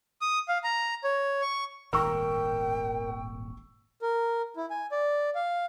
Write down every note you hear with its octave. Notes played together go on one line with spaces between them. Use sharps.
D#6
F5
A#5
C#5
C#6
D#1 G#1 A2 A#4 G5 C#6 E6
A#4
E4
G#5
D5
F5